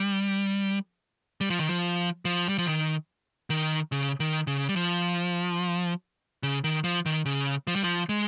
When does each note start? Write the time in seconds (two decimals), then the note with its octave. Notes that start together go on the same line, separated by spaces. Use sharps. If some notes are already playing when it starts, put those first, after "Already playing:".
Already playing: G3
1.41 G3
1.50 F3
1.59 D#3
1.69 F3
2.25 F3
2.49 G3
2.58 F3
2.66 D#3
3.50 D#3
3.92 C#3
4.20 D#3
4.47 C#3
4.69 G3
4.76 F3
6.43 C#3
6.64 D#3
6.84 F3
7.06 D#3
7.26 C#3
7.67 F3
7.76 G3
7.84 F3
8.09 G#3